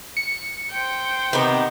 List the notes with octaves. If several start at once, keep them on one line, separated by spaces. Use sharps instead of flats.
C#7
C5 G5
C3 D#3 B3